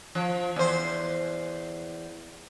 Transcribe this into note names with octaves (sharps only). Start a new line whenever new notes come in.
F3
E2 C5